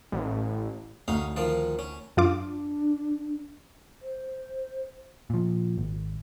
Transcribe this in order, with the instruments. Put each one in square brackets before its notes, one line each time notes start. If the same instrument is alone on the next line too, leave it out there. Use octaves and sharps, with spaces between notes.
[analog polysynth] A1
[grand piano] D2 [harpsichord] C#4 D#4 F5
[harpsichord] D#3 F3 F4
C#4
[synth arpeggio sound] F#2 F4 D6 [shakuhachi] D4
[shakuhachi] C5
[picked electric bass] A#2 F3
G#1